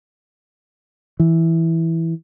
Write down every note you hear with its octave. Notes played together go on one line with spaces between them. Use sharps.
E3